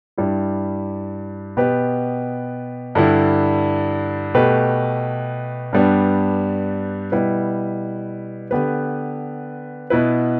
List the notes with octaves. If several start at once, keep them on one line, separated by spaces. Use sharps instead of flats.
G2 G3 E4
B2 B3 G4 B4
G2 D3 G3 E4
B2 A3 G4 B4
G2 G3 B3 D4
B2 G3 E4 B4
D3 B3 G4 B4
B2 B3 E4 B4